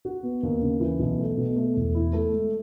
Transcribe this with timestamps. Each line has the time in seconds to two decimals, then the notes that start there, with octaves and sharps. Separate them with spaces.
0.05 F#4
0.23 B3
0.43 D#2
0.62 C#3
0.80 E3
0.99 B1
1.18 A3
1.37 B2
1.56 A3
1.76 E1
1.95 E4
2.13 A3
2.33 G#3